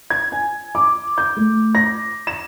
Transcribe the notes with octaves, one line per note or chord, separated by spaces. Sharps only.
G#6
G#5
D6
G6
A3
A#6
E7